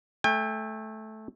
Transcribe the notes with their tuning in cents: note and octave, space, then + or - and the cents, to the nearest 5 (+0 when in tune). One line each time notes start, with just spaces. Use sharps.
A3 -15 G5 +40